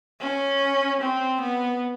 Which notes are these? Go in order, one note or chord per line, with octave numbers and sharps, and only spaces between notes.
C#4
C4
B3